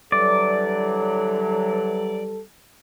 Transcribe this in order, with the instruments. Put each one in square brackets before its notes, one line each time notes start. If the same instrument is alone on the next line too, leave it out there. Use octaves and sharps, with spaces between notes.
[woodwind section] D3 E3 F#3 [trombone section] G3 A4 [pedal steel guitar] D5